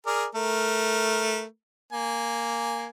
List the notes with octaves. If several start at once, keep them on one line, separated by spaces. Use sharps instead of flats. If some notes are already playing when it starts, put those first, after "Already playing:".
G#4 A#4 D5
A3 A#4
A#3 G#5